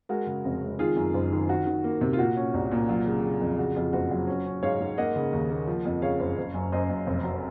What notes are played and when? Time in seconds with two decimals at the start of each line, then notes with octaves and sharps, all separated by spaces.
0.09 G#3 F#4 A#4
0.27 C#3
0.45 F1
0.62 G#3
0.79 D#3 F4 G#4
0.96 F#2
1.14 F#1
1.32 D#3
1.49 D#3 F#4
1.66 D#3
1.84 A#3
2.01 C3
2.13 F4
2.18 A#2 F#4
2.37 C#4
2.54 C2
2.72 A#2
2.89 F#3 F4
3.06 C#3
3.23 C#3
3.41 F2
3.58 C#3 F#4
3.76 F2 F4
3.93 F#1 F#4
4.11 F#3
4.27 C#4
4.46 C#4
4.63 G#2 C#5 F5
4.80 G#2
4.98 A#3 D#5 F#5
5.16 C#3
5.33 D#2
5.50 A#3
5.67 F3
5.85 F2
6.02 C#3 C#5 F5
6.20 F#1
6.38 F#1
6.54 F#2
6.72 F#2 C5 D#5
6.90 F#2
7.07 F1
7.24 F#3